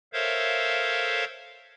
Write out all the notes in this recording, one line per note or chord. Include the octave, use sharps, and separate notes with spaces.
A4 A#4 C5 C#5 E5 F5